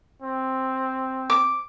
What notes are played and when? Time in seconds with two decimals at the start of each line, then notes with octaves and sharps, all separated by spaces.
0.22 C4
1.30 D6